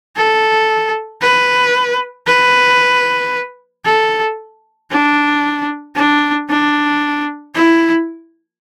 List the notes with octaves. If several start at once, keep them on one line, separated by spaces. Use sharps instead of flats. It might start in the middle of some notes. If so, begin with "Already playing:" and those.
A4
B4
B4
A4
D4
D4
D4
E4